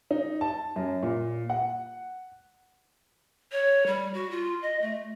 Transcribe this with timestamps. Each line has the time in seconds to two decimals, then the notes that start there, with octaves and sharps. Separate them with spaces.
0.11 D#4
0.41 A5
0.76 F#2
1.03 A#2
1.50 F#5
3.51 C#5
3.86 G3
4.14 F#4
4.31 F4
4.62 D#5
4.81 A3